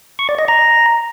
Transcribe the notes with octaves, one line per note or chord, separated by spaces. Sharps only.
C#6
D5
D#5
A#5